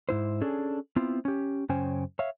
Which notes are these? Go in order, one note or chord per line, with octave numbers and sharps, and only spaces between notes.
G#2 E4 C5
C#4 D4 G#4 A4
B3 C4 E4 F4
C#4 G4
F#2 C#3 C#4 C5 G5 G#5
C#5 E5 F5